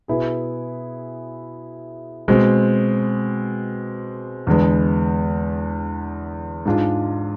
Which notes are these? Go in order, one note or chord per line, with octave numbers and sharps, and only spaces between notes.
B2 B3 E4 G#4
B2 G#3 C4
E2 D3 G#3 B3
G#2 G#3 D4 F4